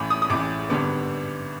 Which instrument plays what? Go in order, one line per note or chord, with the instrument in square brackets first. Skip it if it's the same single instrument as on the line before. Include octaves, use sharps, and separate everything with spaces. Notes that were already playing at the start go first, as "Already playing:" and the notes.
Already playing: [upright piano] A1 A2 E3 D6
D#6
D#6
A1 A2 E3 D6
G#1 G2 D3 G3 B3 D6